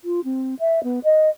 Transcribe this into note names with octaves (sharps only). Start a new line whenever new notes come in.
F4
C4
E5
B3
D#5